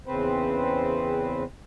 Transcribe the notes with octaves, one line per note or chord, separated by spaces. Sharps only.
E2 C#3 C4 B4 C5